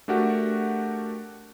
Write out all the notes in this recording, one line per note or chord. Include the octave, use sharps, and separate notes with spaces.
A3 D4 F#4 G4 A#4 F#5